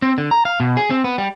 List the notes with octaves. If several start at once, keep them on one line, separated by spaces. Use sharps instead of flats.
C4
D3
A#5
F5
B2
G#4
C4
B3
G3